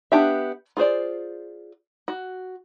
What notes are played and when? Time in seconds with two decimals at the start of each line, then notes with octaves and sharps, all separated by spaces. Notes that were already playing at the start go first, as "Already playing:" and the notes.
0.12 B3 D4 G4 E5
0.77 F4 G#4 C5 D5
2.08 F#4